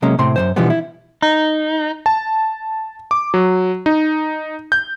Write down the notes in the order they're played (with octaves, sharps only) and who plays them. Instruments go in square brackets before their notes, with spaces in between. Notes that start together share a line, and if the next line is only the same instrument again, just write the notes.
[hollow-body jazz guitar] C3 F#3 G#3 A#3 C#4
A2 C3 C4 C6
F#2 E3 C5
B2 D3 E3 F3 G3 B3
E4
[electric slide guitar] D#4
[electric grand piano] A5
D6
F#3
D#4
G6